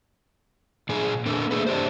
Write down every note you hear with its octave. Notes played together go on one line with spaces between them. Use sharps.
A#2 G#4
A#3 D4 A4 A#4
A3 G#4 B4
D4 G4 C5